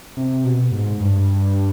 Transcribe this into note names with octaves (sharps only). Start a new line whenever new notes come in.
C3
B2
G#2
G2